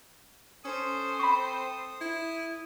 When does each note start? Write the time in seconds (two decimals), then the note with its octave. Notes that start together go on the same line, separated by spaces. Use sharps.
0.65 C#4 A4 C5 D#6
1.19 C4 B5 C#6
2.01 E4